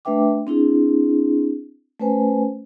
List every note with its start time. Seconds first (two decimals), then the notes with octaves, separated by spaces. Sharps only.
0.05 A3 D4 B4 E5 G5 D6
0.47 C4 D4 E4 G#4
2.00 A3 C#4 B4 C5 G#5